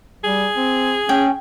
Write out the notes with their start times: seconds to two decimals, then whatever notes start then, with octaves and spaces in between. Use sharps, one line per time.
0.24 G3 G#4
0.57 C4
1.09 C#4 G5